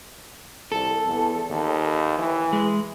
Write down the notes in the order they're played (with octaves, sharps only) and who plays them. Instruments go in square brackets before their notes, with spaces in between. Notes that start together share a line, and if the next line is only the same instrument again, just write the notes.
[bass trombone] C2 [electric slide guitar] A4
[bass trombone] E2
D#2
E3
[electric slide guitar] G#3